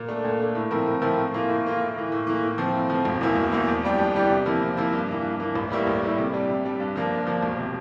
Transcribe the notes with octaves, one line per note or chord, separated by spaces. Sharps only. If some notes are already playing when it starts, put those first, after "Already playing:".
Already playing: A#2
A3 D4
A#2
A3 D4
A2
F3 C4 E4 A#4
A2
F3 C4 E4 A#4
A2
E3 A#3 F4
A2
E3 A#3 F4
A2
E3 A#3
A2
E3 A#3
A2
F3 C4
A2
F3 C4
E1
E2 E3 A#3 E4
E1
E2 E3 A#3 E4
F2
E3 G3 D4 G4
F2
E3 G3 D4 G4
C3
F3 A#3 E4
C3
F3 A#3 E4
G2
E3 A#3
G2
E3 A#3
A1
A2 G3 A#3 E4
A1
A2 G3 A#3 E4
C3
G3 D4
C3
G3 D4
G2
F3 A#3 D4
G2
F3 A#3 D4
E1
C3